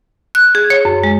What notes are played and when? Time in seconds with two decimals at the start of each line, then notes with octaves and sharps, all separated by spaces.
0.35 F#6
0.55 G#4
0.70 C#5
0.85 F#2
1.04 G#3